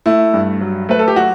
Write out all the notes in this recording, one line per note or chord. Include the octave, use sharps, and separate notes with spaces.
A3 E4
G2
F#3
A3 B4
A4
G4
F#3 F#4